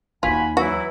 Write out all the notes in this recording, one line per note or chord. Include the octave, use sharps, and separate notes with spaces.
D#2 D#4 F4 F#4 G#5 B5
E3 F#3 E4 F#4